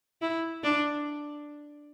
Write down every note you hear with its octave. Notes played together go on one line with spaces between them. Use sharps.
E4
D4